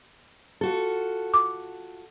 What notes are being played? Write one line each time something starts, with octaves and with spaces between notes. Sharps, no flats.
F4 F#4 A4
D6